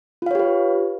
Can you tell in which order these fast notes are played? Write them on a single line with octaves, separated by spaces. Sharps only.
F4 F5 C#5 G4 B4